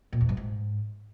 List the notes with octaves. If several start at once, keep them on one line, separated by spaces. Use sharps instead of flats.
A#2
E2
G2
G#2